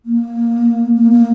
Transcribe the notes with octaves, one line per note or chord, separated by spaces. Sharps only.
A#3
A#3
A#3